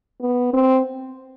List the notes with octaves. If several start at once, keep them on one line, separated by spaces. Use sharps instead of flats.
B3
C4